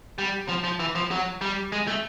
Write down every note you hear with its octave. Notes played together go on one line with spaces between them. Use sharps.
G3
F3
F3
E3
F3
F#3
G3
G#3
A3